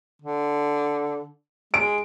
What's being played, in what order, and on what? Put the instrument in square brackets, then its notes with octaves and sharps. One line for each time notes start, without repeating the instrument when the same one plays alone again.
[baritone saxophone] D3
[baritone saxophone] G#3 [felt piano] D7